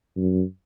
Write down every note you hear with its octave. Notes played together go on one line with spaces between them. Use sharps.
F#2